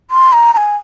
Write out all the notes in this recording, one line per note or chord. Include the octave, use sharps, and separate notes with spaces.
C6
A#5
A#5
G#5